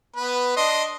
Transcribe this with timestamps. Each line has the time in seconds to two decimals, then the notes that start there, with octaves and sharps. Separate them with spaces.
0.16 B3 B4
0.57 D4 D#5 C6